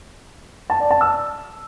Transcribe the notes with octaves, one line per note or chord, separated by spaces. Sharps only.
A5
D5
A5
E6